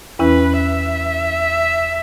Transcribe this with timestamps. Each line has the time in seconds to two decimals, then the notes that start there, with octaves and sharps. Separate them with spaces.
0.19 E2 E3 C#4 E4 B4
0.58 E5